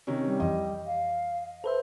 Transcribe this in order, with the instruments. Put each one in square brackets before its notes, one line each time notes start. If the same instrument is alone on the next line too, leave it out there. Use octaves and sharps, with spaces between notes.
[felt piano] C3 D#3 C#4
[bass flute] G3
[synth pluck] F2 E3 [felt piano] D#5
[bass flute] F5
[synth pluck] A4 B4 E5 [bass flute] C5